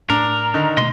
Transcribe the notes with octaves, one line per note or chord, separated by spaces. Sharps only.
A2 D4 A#4 A#5
D3 D#3 D#4
B2 A3 D#5 C6